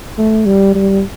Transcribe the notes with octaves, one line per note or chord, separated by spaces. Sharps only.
A3
G3
G3